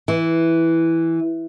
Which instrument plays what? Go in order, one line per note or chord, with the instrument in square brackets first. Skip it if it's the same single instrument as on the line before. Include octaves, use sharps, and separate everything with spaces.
[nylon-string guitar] E3